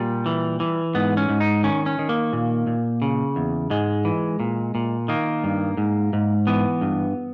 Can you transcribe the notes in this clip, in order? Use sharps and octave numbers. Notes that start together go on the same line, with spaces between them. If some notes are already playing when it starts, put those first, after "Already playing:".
Already playing: A#2 G3
E3
E3
G#2 B3
C#4
G#2
D#4
D#3 C#4
C#4
D#3
A#3
A#2
A#2
C#3
E2
G#2 G#3
E3
A#2
A#2
D#3 A#3
G2
G#2
G#2
E3 B3
G2